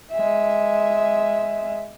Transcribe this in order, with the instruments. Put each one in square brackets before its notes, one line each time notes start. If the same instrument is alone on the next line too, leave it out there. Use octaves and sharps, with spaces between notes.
[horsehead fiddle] G#3 E5